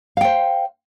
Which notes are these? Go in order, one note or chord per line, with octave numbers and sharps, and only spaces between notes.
C5 F5 G5